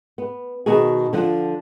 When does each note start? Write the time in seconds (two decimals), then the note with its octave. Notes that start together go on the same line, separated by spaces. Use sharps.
0.18 B3
0.66 B2 D#3 F#4 G#4
1.13 D3 F3 F#5